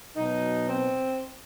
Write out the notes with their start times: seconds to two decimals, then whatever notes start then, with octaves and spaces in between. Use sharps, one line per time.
0.17 B2 F#3 D#4
0.69 C4